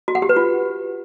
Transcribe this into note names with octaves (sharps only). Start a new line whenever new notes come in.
F#4
F#5
G4
B4
F4